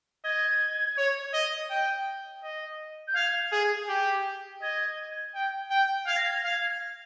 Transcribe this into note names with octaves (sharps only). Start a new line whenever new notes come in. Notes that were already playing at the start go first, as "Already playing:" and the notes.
D#5 G#6
C#5
D#5
G5
D#5
G6
F5 G#6
G#4
G4
D#5 G#6
G5
G5
F5 G#6
A#6
G#6
F5